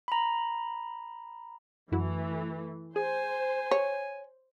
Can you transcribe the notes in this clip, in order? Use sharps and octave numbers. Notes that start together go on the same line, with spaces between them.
A#5 B5
F#2 E3 A3 E4 F#4
G#4 C5 G#5
C#5